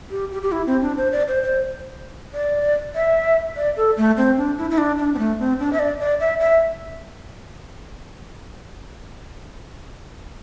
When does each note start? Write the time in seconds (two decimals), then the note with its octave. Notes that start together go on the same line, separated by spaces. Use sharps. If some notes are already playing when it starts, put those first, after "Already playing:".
0.11 G4
0.32 G4
0.42 G4
0.52 E4
0.67 C4
0.82 D4
0.97 C5
1.12 D5
1.28 C5
1.43 C5
2.34 D5
2.95 E5
3.56 D5
3.77 A4
3.97 A3
4.17 C4
4.37 D4
4.58 E4
4.70 E4
4.78 D4
4.98 D4
5.14 C4
5.19 A3
5.39 C4
5.59 D4
5.73 E5
5.79 D5
6.00 D5
6.20 E5
6.40 E5